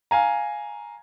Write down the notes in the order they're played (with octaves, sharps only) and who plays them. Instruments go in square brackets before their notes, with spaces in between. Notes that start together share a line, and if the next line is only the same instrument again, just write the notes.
[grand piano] F5 G#5 A#5